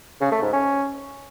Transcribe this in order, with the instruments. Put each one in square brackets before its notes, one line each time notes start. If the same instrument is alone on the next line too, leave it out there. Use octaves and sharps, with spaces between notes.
[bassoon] C#3
A3
G#2
C#4